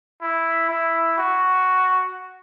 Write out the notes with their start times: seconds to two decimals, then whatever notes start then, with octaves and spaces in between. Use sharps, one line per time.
0.22 E4
0.70 E4
1.18 F#4